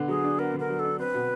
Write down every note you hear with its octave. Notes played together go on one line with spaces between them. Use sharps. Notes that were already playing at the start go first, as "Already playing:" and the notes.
Already playing: D3 B3
F#3 G#4
D4
B3 A#4
D3
A#4
F#3
A4
D4
C4 B4
B2